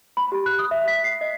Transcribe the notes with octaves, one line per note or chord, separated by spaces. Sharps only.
B5
G4
F#6
D#6
E5
B6
C7
D#5